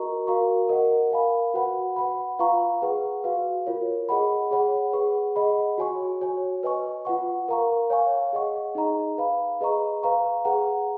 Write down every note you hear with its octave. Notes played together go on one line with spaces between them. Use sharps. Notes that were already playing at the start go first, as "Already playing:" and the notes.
Already playing: F#4 A#4 D#5 A#5 C#6
F#4 A#4 F5 A#5 C#6
A#4 D#5 F#5
A#4 F5 G#5 B5
F#4 B4 F#5 B5
B4 F#5 B5
F4 B4 F5 A#5 C#6
G#4 B4 F#5 C#6
F#4 B4 F5
F4 A#4 C#5
G#4 D#5 F#5 B5
G#4 C#5 F#5 B5
G#4 B4 F#5 C#6
G#4 D#5 F#5 B5
F#4 C#5 G#5 C#6
F#4 C#5 G#5
B4 D#5 G#5 C#6
F4 B4 F#5 C#6
A#4 F5 A#5 C#6
C#5 F5 G#5 C#6
G#4 D#5 F#5 C#6
D#4 G#4 D#5 A#5
B4 F5 B5
G#4 B4 D#5 A#5 C#6
B4 F5 A#5 C#6
G#4 B4 F#5 A#5